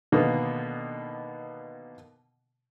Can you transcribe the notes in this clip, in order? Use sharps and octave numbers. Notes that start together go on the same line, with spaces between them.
B2 D3 D#3 A#3 B3